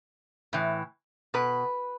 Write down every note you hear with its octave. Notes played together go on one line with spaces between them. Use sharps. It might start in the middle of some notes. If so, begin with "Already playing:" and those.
A2 E3
B2 B4